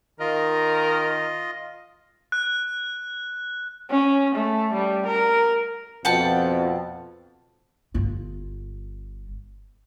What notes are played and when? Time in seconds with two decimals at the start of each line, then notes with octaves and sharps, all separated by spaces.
0.20 D#3 F4 A#4 D#5
2.32 F#6
3.91 C#4
4.35 A3
4.73 G3
5.06 A#4
6.05 F2 B2 F#5 G5 A5
7.94 G1 F4